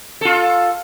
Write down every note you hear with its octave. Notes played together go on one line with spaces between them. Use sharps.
F4 A4